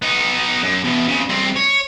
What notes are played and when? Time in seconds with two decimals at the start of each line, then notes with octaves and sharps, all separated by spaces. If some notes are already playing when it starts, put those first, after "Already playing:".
0.02 B3 D#4
0.62 F#2
0.85 E2 B2
1.08 F2 C#3
1.29 G2 C4
1.56 C#5